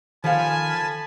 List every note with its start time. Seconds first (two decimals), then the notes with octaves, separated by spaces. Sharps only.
0.24 D#3 F3 A4 F5 G#5 A5 B5